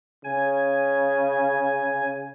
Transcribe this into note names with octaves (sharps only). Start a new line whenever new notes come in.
C#3 G#5